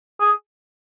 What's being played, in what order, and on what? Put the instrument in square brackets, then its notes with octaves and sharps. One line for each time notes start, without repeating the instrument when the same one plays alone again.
[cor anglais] G#4